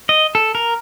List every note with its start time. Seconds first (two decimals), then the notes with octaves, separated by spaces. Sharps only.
0.09 D#5
0.35 A4
0.55 A#4